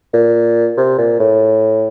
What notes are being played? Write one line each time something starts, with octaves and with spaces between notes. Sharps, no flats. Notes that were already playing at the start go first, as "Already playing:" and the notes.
A#2
C3
A#2
A2